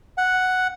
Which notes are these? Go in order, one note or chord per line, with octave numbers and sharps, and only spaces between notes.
F#5